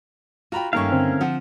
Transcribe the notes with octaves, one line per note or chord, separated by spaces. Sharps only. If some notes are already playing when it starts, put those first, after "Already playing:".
F4 F#4 G5 A#5 B5
G2 D#3 A3 A#3 C#4 A#4 F5 C#6
D3 C4
F3 F#5